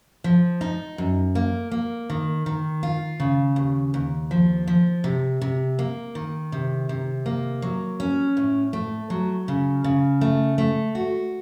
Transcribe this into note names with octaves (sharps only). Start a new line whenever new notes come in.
F3
D#4
F#2
A#3
A#3
D#3
D#3
F4
C#3
D#2
D#2
F3
F3
C3
C3
A#3
D#3
C3
C3
A#3
F#3
C#4
A2
A3
F#3
C#3
C#3
A3
A3
F#4